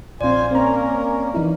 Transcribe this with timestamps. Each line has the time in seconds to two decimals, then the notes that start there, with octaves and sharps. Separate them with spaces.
0.21 A#1 C4 F4 C5 D5 G#5
0.51 A#3 C4 C#4 A#4 A#5
1.34 E3 D#4 E4